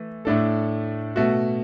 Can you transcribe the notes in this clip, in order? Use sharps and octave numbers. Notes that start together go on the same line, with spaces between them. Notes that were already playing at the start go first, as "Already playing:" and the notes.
Already playing: E3 A3
A2 A3 D4 A4
B2 A3 F#4